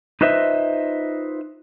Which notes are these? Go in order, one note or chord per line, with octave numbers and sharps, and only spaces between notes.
D#4 F4 B4 C5 D#5 E5